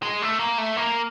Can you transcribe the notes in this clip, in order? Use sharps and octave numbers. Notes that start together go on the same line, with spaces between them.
G#3
A3
A#3
A3
A#3